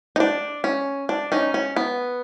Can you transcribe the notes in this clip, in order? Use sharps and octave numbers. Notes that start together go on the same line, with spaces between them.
D#4
D4
C#4
D4
C#4 D#4
C#4
B3